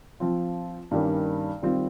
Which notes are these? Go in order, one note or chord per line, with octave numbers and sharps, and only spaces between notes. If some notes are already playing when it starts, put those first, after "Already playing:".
F3 C4 F4
G2 D#3 G3 A#3 C#4
D#3 G3 C4 F4